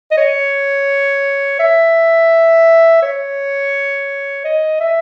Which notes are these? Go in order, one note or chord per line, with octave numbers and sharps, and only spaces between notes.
D#5
C#5
E5
C#5
D#5
E5